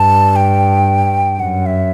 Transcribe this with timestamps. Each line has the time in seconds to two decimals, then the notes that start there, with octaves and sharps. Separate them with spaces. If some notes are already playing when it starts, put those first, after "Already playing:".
Already playing: G2 A5
0.36 G5
1.40 F#2 F#5
1.66 E5